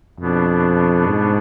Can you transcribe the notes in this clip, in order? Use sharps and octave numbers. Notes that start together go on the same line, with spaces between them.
F2 B2 B3 D4
G#2